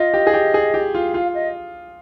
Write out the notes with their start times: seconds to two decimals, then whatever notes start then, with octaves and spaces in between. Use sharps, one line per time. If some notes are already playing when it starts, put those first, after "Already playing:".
Already playing: F4 D#5
0.14 G4
0.27 G#4
0.34 G4
0.54 G#4
0.74 G4
0.95 F4
1.14 F4 F5
1.34 D#5